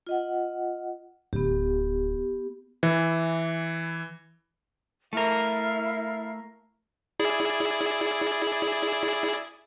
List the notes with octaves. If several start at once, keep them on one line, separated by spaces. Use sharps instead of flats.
F4 D#5 F#5
D1 B3 G4
E3
A3 E4 A#4 F5
E4 G#4 D5